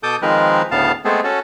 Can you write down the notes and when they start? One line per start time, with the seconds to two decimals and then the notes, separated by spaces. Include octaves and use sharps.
0.03 B2 A4 D6 D#6 G6
0.22 D#3 F3 G#3 C4 A#4 B4
0.71 D2 A2 C#3 B3 F5 A5
1.05 G#3 A3 B3 C4 G#4 A4
1.24 C#4 F#4 A4